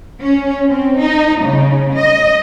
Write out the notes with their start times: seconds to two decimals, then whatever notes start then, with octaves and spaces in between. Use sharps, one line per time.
0.20 C#4
0.68 C4
0.98 D#4
1.43 C#3
1.96 D#5